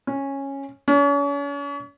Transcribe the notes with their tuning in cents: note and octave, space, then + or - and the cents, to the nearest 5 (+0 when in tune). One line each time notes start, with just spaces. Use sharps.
C#4 -10
C#4 +40